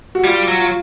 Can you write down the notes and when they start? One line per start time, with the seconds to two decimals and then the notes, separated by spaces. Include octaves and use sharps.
0.15 F#4
0.24 G3 F4
0.48 F#3
0.59 F4